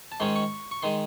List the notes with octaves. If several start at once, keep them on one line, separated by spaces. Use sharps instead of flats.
A5
G#2 D#3 G#3 C#4 C6
C#6
C#6
D#3 G#3 C6